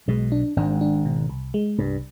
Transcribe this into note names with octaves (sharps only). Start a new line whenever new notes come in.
B1 B2 G#3
D4
G#1 G#2 D4
D4
B2
C2
G#3
C2 G2